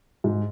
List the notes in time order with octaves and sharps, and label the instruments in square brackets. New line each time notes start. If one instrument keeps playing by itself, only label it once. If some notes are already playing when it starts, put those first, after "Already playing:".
[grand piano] G#2